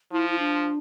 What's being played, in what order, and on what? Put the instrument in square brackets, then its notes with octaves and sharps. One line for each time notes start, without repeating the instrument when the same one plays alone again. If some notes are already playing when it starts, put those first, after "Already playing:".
[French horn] F3 [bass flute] E4
[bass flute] E4
D4